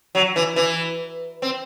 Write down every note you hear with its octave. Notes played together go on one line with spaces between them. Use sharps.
F#3
E3
E3
C4